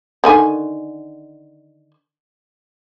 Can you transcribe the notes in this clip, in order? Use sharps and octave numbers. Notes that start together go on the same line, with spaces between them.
D3 D#3 G#5